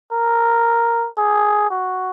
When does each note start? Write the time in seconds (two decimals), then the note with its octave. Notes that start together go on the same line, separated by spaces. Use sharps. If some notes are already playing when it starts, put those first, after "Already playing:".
0.12 A#4
1.17 G#4
1.70 F#4